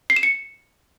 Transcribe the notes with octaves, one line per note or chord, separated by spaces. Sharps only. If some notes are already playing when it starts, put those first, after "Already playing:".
C7
E7
C#7